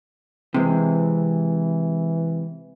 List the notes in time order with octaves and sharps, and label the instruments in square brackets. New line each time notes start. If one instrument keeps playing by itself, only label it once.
[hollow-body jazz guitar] C3 G#3 [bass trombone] E3